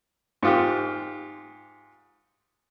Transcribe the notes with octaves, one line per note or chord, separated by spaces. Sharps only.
G#2 F4 G4